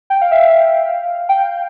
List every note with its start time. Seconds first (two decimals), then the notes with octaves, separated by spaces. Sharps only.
0.10 G5
0.21 F5
0.31 E5
0.42 F5
1.29 G5